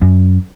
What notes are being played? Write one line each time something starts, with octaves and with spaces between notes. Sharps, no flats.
F#2